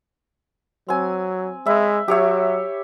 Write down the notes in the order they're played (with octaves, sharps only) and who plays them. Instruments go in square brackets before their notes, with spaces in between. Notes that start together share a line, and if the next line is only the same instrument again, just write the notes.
[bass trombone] F#3 [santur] C4 G#5
[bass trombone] G#3 [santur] E5 B5
[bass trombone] F#3 [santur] G4 C#5 E5